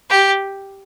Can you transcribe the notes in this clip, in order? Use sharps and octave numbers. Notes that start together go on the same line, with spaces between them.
G4